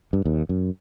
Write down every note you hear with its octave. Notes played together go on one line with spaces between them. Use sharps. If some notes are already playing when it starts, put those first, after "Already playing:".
G2
D#2
F#2